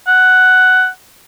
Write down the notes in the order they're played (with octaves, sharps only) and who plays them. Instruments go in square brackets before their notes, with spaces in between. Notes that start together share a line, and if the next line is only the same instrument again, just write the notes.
[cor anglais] F#5